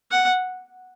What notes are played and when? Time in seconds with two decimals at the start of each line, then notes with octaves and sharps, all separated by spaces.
0.11 F#5